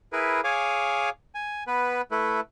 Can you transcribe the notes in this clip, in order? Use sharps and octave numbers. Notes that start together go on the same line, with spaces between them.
E4 G#4 A#4 B4
G#4 C#5 F5 G#5 D6
G#5
B3 B4
A3 E4 A4 B4